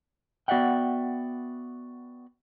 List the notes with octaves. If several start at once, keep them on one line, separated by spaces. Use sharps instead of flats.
B3 F#4 D5 E5 F#5 G5